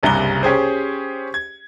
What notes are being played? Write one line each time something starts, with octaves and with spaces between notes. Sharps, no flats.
F#1 C2 G2 C3 A#5 G7
C#4 G4 G#4 C5
G#6